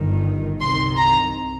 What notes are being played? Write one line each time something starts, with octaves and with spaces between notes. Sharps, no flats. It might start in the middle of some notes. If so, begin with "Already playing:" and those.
Already playing: G1 G2 D#3
C2 C3 D#3 C6
A#5